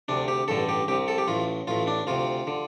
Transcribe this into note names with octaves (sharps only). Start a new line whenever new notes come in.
D2 C3 D4
G4
A1 G2 D3 A4
G4
C2 C3 G4
A4
G4
A1 A2 F4
A1 A2 F4
D4
D2 C3 F4
D3